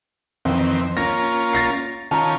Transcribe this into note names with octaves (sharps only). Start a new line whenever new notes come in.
F2 D#3 E3 C4
A#3 C#4 F4 A#6
A6 A#6 C7
D#3 C#4 F4 A5 A#5